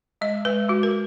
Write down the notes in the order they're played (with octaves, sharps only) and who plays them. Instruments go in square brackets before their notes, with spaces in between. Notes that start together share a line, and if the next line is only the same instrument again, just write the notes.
[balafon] G#3 D#5
G#3 B4
G#3 F#4
A#4